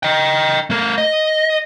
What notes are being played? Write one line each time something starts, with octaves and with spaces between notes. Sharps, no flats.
D#5 G5
A3 A#4
D#5